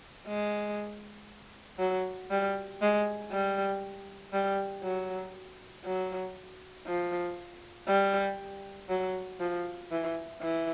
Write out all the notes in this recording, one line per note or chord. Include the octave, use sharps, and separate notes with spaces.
G#3
F#3
G3
G#3
G3
G3
F#3
F#3
F3
G3
F#3
F3
E3
E3